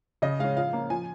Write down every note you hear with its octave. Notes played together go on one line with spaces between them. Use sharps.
C#3 D#5
G#3 C#4 F5
F3 F5
A#3 C#4
F3 G#5